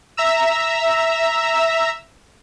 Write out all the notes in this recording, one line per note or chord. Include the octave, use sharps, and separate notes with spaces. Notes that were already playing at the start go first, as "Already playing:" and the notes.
E5 A#5 E6